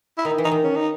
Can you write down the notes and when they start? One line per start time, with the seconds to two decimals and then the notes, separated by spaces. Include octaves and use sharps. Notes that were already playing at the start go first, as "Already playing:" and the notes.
0.18 E4
0.25 D#3 D#4
0.38 E3
0.44 D#4
0.52 D#3
0.63 C#4
0.76 D#4